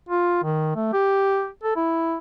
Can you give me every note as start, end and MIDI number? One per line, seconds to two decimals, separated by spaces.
0.09 0.41 65
0.44 0.71 51
0.76 0.93 57
0.93 1.49 67
1.64 1.76 69
1.76 2.17 64